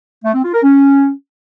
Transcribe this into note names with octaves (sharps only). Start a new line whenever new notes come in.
A3
C4
F4
A#4
C#4